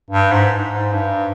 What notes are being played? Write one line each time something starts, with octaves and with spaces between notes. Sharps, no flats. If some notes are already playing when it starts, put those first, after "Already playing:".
G2
G#2
G#2
G2